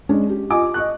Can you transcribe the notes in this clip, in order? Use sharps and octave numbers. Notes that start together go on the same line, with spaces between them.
G#3 C#4 D4
G4
F4 D#5 G#5 D6
D#5 C#6 F#6